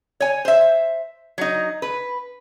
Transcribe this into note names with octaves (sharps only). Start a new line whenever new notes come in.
C#5 G#5
C5 E5
F#3 D#4
B4